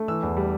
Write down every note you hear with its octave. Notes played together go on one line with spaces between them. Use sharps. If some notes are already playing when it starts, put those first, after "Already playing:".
Already playing: A3
E3 E6
E2
G3